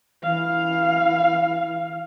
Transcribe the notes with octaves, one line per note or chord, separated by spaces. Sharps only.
E3 F5